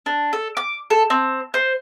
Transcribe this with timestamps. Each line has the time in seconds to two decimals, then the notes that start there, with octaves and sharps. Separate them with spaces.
0.06 D4
0.33 A4
0.57 D6
0.90 A4
1.10 C4
1.54 C5